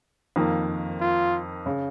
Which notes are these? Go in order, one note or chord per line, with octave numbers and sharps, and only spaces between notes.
F2 D#3 A#3
F4
C#3